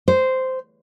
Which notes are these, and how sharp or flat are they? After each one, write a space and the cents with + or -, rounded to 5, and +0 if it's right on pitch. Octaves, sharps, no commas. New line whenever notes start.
C5 -10